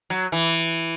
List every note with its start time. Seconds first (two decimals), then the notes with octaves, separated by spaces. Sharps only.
0.10 F#3
0.32 E3